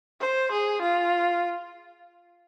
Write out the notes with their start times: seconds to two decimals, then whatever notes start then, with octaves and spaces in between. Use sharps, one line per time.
0.20 C5
0.52 G#4
0.82 F4